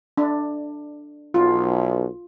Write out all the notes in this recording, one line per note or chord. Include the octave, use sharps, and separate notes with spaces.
D4
B1 F4